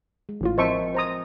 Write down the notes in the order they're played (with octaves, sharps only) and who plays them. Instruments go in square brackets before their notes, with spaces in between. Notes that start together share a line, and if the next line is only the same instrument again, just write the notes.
[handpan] G#3
[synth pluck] A1 A2 F4
[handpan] F3 C4 A#4 [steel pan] C5 E5 C#6 [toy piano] D#5 A5
[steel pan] C5 A#5 D#6